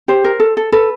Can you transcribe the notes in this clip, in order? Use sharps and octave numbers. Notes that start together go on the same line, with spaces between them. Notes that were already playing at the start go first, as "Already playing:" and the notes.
G4 C5
A#4
A4
A4
A4 B4